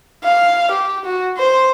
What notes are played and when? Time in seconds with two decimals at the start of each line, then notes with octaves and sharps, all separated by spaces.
0.24 F5
0.71 G4
1.05 F#4
1.38 C5